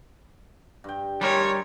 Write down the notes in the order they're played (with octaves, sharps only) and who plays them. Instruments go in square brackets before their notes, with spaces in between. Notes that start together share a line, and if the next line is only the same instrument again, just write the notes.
[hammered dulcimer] G2 G5
[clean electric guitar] G3 A#4 [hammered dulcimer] G#3 [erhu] C#5